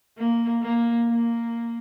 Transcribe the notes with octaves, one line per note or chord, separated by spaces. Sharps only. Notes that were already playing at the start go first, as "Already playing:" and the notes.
A#3
A#3
A#3